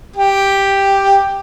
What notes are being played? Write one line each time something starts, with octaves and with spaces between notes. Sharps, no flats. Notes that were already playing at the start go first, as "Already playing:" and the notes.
G4